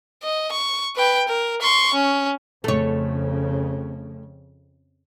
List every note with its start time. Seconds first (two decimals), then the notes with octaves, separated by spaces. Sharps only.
0.23 D#5
0.52 C#6
0.96 B4 G5
1.28 A#4
1.62 C6 C#6
1.94 C#4
2.64 F2 C#3 A3 C#5